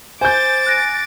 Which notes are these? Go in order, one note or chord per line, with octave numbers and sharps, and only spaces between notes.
C5 G#5 D6 G6 A6
F#6 A#6 D7